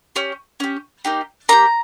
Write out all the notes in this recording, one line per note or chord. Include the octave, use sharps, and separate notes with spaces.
C#4 G4
C#4 G4
A#3 D#4 G4
A#3 D#4 G4 A#5